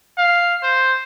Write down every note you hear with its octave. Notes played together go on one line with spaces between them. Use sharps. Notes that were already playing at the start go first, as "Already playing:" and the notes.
F5
C5